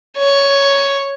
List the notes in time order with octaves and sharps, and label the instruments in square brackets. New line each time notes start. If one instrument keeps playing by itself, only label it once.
[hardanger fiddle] C#5